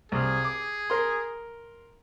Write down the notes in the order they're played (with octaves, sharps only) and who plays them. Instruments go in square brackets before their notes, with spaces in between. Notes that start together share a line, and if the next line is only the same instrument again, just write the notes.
[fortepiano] C2 F6 [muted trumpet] G#4
[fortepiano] D6
A#4 C6